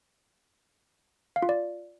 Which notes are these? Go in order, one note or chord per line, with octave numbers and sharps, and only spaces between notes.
F5
F4
D5